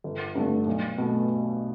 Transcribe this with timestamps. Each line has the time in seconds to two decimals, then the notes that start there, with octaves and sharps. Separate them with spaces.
0.04 G1
0.35 G2 D3 A3
0.67 B1
0.98 B2 A3